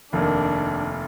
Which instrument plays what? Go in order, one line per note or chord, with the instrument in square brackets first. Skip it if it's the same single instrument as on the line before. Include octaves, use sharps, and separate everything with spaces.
[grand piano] F1 D#2 D#3 [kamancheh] D4